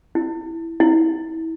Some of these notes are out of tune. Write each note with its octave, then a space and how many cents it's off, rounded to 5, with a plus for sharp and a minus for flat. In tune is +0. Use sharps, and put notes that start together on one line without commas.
E4 +0
E4 -30